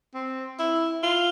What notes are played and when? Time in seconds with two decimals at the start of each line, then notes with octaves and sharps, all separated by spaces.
0.14 C4
0.59 E4
1.03 F4